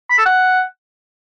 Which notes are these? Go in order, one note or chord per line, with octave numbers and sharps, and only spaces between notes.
B5
A4
F#5